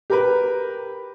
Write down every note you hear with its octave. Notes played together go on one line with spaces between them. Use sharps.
G4 A#4 B4